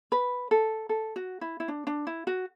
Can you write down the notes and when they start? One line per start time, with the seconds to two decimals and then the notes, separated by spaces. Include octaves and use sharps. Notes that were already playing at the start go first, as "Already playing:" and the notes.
0.12 B4
0.51 A4
0.89 A4
1.16 F#4
1.41 E4
1.60 E4
1.68 D4
1.87 D4
2.07 E4
2.27 F#4